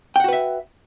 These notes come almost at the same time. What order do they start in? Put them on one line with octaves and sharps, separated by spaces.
G5 F#5 F#4 B4 E5